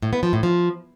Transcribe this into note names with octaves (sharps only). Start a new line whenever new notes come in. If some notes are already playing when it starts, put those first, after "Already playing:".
A2
B3
F3
A2
F3